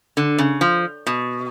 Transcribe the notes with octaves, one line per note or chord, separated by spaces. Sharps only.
D3
C#3
F3
B2